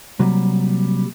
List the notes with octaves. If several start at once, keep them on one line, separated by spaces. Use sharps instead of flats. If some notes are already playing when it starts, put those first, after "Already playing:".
C3 F#3 G3 A#3